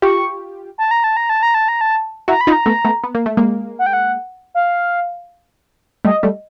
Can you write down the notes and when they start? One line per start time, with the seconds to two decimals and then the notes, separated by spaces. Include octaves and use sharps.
0.02 F4 G4 C#6
0.78 A5
0.91 A#5
1.04 A5
1.17 A#5
1.30 A5
1.43 A#5
1.55 A5
1.68 A#5
1.81 A5
2.28 E4 F#4 A#5
2.41 B5
2.47 D#4 F4
2.52 A#5
2.66 A3 B3
2.85 A3 B3
3.04 B3
3.15 A#3
3.26 A3
3.37 G#3 A#3
3.79 F#5
3.86 G5
3.93 F#5
4.54 F5
6.05 G3 A3 D#5
6.23 G3 A3